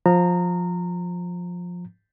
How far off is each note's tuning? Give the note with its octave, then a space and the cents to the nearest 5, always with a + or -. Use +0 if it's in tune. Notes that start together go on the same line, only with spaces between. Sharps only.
F3 +15 A#5 -20